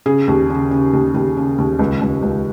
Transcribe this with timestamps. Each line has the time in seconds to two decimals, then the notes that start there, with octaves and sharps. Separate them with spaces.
0.06 C#3 G#4
0.28 D#2
0.50 C#3
0.71 C#3
0.93 D#2
1.14 D#2
1.37 C#3
1.58 D#2
1.79 C#2
2.01 C#2
2.22 C#2